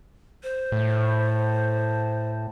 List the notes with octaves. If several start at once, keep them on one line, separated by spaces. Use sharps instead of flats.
C5
A2